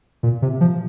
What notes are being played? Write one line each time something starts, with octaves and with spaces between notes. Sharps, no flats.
A#2
C3
F3